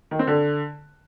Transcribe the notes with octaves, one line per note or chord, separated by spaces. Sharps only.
D#3
C4
D3